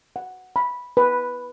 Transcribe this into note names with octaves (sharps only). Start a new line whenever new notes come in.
F#5
B5
B4